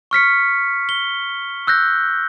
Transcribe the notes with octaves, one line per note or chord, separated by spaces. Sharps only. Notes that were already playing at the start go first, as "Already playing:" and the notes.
C#6 F6 B6 C#7
G7
E6 F#6 G6 A#6